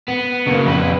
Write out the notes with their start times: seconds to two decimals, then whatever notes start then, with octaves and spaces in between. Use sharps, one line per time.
0.08 B3
0.46 C#3 A#3
0.66 F2 B4